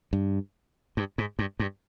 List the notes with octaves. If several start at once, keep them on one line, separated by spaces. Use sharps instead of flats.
G2
G2
G#2
G2
G2